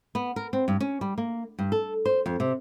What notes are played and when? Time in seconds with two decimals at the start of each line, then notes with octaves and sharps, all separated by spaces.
0.15 B3
0.36 A#4
0.53 C4
0.68 G2
0.81 C#4
1.01 G3
1.18 A#3
1.59 G2
1.72 A4
2.05 C5
2.26 F2
2.40 C3